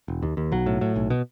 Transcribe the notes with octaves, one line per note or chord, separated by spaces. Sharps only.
E1
D#2
D#2
B1 F#3
A2
A2
B1
B2